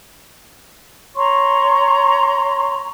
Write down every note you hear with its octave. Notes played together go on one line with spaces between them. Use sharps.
C#5 A#5 C6 C#6